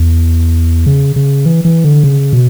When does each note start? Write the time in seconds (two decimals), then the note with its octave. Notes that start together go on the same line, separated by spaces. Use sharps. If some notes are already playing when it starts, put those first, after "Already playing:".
Already playing: E2
0.86 C#3
1.16 C#3
1.46 E3
1.65 E3
1.84 D3
2.04 C#3
2.33 B2